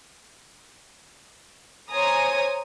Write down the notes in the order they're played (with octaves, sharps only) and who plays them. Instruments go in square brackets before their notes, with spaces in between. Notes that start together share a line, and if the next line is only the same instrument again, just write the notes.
[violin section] C5 C#5 G#5 A#5 D#6